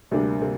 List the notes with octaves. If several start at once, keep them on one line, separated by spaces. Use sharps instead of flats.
D2 C3 G3 A#3 D4
C3 A#3